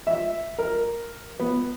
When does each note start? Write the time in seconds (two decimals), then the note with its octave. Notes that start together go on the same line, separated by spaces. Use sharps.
0.07 E5
0.58 A#4
1.40 B3